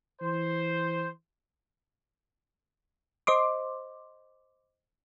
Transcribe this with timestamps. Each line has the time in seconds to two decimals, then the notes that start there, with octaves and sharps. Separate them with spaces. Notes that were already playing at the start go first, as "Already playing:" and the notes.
0.22 E3 C5
3.27 C5 D#5 C6 D6